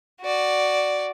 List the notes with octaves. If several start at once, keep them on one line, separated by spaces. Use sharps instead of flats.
F#4 D5